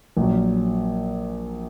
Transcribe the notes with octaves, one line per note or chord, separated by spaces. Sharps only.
A#1 A#2 F#3